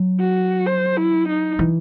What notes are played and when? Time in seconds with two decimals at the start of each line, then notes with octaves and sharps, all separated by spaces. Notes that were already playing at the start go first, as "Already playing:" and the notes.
Already playing: F#3
0.20 F#4
0.66 C5
0.97 E4
1.28 D#4
1.59 E3